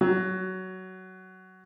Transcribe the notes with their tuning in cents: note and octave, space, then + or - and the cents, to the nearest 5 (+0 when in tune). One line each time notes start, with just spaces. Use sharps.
F#3 +15